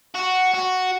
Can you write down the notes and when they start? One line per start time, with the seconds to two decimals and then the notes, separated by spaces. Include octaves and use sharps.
0.14 F#4
0.54 F#4